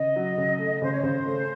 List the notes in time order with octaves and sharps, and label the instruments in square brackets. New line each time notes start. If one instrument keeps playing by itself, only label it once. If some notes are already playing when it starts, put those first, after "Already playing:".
Already playing: [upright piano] C#3 [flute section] D#5
[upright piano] F#3
C#3
A3
[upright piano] C#3 [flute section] C5
[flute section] C#5
[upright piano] C#3 [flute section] C5
[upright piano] A3